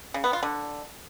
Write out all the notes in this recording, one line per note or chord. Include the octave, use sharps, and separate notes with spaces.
C#3
B3
F4
D3